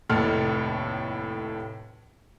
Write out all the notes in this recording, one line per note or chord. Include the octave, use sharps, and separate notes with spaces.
F1 D#2 A2 A4 F6